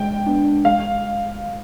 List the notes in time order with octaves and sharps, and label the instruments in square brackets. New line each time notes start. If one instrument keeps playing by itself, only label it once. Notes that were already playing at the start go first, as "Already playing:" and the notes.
Already playing: [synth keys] G#3 [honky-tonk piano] G5
[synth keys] B3 D4
[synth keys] G#3 [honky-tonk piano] F5